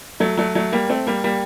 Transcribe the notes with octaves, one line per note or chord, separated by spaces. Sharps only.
F#3 A3
F#3 A3
F#3 A3
G3 A#3
A3 C4
G3 A#3
G3 A#3